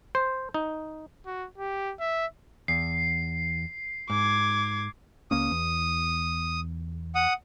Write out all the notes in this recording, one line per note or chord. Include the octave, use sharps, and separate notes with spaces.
C5
D#4
F#4
G4
E5
E2 C7
G#2 D6 G#6
C#2 A#3 C#4 D#6
E2
F#5 D#6